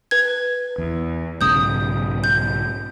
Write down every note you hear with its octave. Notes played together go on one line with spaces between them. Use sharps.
B4 G#6
E2
B1 G#2 C#3 D#6 G6
G6